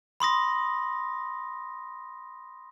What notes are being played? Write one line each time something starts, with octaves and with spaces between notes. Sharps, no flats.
B5 C6 D#6 A#6